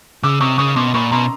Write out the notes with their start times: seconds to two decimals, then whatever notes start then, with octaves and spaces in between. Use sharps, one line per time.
0.23 C#3 D6 E6
0.40 C3 C#6 D#6
0.58 C#3 C#6 D#6
0.76 B2 C6 D6
0.94 A#2 B5 C#6
1.11 B2 A#5 C6